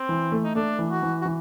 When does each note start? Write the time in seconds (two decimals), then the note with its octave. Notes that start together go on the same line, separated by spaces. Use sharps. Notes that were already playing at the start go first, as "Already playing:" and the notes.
Already playing: C4
0.09 E3
0.32 A3
0.44 D#4
0.55 A3 D4
0.79 E3
0.91 F#4
1.03 E3
1.22 F#4
1.25 E3